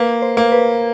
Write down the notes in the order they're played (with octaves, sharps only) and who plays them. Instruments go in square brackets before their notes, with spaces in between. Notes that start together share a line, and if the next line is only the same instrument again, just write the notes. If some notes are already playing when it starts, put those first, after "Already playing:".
Already playing: [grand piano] A#3 [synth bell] B4
[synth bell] C5
[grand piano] A#3
[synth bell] B4